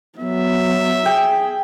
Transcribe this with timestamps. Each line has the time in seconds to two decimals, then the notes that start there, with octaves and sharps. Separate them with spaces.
0.19 F#3 B3 E5
1.06 G#4 G5